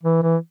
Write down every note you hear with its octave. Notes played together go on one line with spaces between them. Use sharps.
E3
E3